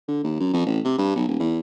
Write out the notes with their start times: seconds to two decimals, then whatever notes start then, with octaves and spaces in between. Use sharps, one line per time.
0.08 D3
0.24 D#2
0.40 F#2
0.54 F2
0.66 A1
0.85 C3
0.98 G2
1.16 B1
1.28 D#1
1.40 E2